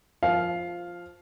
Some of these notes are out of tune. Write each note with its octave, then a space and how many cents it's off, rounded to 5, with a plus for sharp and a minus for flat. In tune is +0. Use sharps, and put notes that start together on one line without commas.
F3 +0 F5 +0 A5 -40